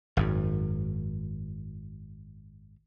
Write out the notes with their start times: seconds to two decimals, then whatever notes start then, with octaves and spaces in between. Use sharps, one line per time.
0.17 G#1 F#2